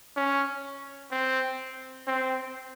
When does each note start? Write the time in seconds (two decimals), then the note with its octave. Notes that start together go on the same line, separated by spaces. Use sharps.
0.17 C#4
1.12 C4
2.07 C4